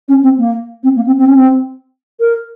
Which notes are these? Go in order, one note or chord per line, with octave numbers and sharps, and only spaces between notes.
C#4
C4
A#3
C4
A#3
C4
C4
C#4
C4
A#4